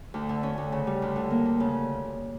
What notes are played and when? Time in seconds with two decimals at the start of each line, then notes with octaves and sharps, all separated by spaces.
0.14 D2
0.29 D3
0.43 C#4
0.58 D2
0.72 C#3
0.87 G3
1.02 D2
1.16 D3
1.31 A#3
1.45 D2
1.60 C#3